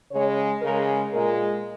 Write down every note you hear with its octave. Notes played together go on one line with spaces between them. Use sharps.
C#3 G#3 C#5
C#3 G#3 A#4
A#2 G#3 A#4